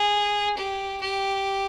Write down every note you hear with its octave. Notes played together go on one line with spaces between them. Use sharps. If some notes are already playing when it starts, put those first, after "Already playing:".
Already playing: G#4
G4
G4